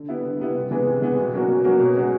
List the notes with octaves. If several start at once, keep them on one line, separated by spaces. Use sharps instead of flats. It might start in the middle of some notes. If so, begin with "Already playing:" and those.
Already playing: D3
G3 B3 E4
D3
G3 B3 E4
C3
E3 G#3 B3
C3
E3 G#3 B3
B2
F#3 A#3 C#4 F#4
B2
F#3 A#3 C#4 F#4
B2
G#3 C#4 F#4